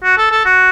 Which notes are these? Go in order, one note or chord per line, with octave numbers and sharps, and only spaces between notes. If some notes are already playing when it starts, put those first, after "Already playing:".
F#4
A4
A4
F#4